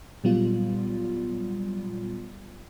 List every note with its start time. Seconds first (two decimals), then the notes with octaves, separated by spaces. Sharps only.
0.24 A#2 F#3 G3 B3 F4